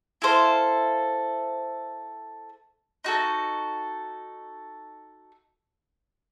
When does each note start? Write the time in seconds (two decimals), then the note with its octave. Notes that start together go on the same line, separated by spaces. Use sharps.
0.22 E4 A4 C5 F5
3.04 D#4 F#4 A4